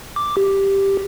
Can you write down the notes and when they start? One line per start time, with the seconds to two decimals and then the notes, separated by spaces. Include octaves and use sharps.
0.16 D6
0.37 G4